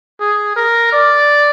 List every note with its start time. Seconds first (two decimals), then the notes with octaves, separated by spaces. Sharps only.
0.20 G#4
0.56 A#4
0.93 D5